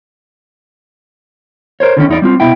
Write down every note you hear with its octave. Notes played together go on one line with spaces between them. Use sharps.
A#4 C5 C#5
D3 D#3 C#4
E2 D#4 D5
G3 C4 F4
C2 B2 E4 G5